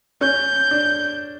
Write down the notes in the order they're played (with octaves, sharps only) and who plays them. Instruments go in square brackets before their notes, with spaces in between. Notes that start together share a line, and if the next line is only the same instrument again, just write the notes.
[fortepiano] C#4 [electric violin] G6
[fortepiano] D4